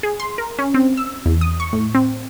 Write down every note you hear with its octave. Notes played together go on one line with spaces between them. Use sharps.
G#4
C6
A#4
C#4
C4
E6
E2
D#6
C#6
A2
C4